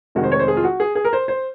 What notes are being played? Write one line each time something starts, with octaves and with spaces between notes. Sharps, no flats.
F1 F2 D#3 G#3 F#4
C5
C#5
C5
G#4
F4
F#4
G#4
G#4
A#4
C5
C5